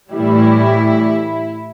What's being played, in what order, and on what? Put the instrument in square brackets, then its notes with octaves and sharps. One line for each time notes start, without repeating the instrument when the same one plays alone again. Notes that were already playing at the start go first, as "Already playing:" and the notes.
[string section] A2 E3 G3 E4